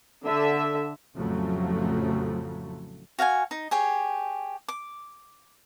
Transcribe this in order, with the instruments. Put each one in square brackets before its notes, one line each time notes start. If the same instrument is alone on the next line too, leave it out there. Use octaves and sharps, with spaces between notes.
[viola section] D3 E5
[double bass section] A1 F2 C#3 F3 F#3 A3
[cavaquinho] F#4 F5 F#5 G#5
D#4
G4 G#4 C#5
D6